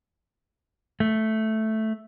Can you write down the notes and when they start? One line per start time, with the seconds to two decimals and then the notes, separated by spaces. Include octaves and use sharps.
1.00 A3